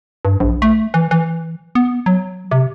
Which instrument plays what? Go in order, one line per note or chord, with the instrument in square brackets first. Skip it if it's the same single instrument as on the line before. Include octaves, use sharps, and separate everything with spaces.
[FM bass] G2
A#1
A3
E3
E3
B3
F#3
C3